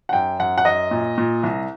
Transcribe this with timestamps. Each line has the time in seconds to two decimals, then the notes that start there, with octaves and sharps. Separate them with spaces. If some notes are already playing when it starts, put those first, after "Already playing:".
0.09 F#5
0.13 F#2 G5
0.39 F#2 F#5
0.58 F#5
0.65 F#2 D#5
0.91 A#2
1.18 A#2
1.43 C2